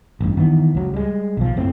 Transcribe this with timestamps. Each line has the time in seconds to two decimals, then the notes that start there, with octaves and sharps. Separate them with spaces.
0.21 A1 G2
0.37 D#3 E3 B3
0.75 C#2 F#3
0.94 G3 G#3
1.37 B1 F3
1.56 F#1 A2 C4